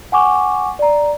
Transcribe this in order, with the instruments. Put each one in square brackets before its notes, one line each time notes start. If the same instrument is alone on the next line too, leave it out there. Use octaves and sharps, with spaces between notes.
[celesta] F#5 G#5 C#6 D6
D5 A#5